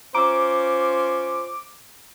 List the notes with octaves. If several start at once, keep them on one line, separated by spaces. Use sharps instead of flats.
C#4 F4 C5 A#5 D6 E6